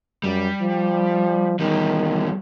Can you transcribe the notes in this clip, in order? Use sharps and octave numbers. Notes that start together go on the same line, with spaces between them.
F#2 G3
F3
E2 D#3 G3